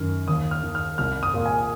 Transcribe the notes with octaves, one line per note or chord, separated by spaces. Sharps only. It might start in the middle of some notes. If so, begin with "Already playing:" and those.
Already playing: F#2 D#3 F6
D#2 D#6
F6
D#3
F6
C2 F6
D#6
A#2
G#5